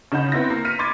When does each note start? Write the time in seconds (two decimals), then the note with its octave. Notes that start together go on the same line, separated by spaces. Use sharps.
0.12 C#3 D#4 D#5 F#5 B5 G6
0.32 B3 C4 E4 A#6
0.50 A#3
0.65 F6 B6 C#7 D#7
0.79 B5 C6 D6 G#6 A6